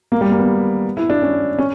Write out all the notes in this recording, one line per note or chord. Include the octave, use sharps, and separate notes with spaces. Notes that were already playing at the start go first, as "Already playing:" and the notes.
A#3
G3
A#3
B3
E4
D4
C#4
C#4